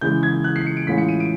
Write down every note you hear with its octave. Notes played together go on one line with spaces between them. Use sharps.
C#3 E3 G#3 G6
G#6
F#6
C7
C#7
D7
A2 E3 G#3 C#4 F4 B6
C#7
D#7
D7